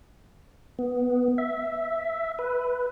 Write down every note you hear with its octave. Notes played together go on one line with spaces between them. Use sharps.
B3
E5
B4